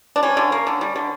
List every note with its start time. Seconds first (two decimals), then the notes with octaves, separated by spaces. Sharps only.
0.16 D4
0.23 G3 C#4
0.37 D3
0.52 A#3
0.67 D3
0.81 G3
0.96 D3